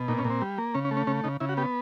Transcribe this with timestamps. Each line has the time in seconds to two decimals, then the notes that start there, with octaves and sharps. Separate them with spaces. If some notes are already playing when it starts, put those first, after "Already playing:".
Already playing: B2
0.08 A#2 D#4
0.18 C#4
0.25 A#2
0.30 C4
0.41 G3
0.58 A#3
0.74 C#3 C#4
0.85 C#4
0.91 A3
0.97 C#4
1.07 C#3 C#4
1.24 C#3 D#4
1.40 C#3 E4
1.49 F#4
1.57 B3 G4